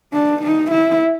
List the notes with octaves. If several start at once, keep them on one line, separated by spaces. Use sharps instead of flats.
D4
D#4
E4